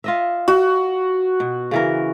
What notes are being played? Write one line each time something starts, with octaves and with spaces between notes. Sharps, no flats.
F4 D#5 E5
F#4
B2
C#3 E3 A#4